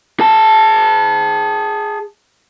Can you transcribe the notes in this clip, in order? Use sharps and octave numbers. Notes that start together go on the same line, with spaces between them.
G#4 A5